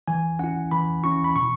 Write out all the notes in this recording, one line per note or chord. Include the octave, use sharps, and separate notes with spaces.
E3 G#5
C#4 E4 F#5
E3 B5
C#4 E4 C#6
B5
B2 C#6